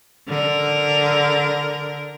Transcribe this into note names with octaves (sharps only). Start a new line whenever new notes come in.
D3 A#4